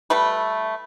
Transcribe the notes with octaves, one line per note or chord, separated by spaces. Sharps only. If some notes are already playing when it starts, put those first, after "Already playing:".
G3 A3 B4